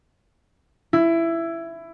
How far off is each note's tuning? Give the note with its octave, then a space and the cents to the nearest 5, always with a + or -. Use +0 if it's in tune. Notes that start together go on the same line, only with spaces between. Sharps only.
E4 +15